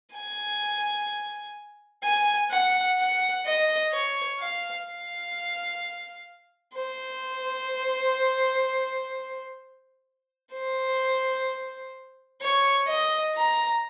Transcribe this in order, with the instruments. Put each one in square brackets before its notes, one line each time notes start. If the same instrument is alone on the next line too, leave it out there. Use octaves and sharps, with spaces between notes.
[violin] G#5
G#5
F#5
F#5
D#5
C#5
F5
F5
C5
C5
C#5
D#5
A#5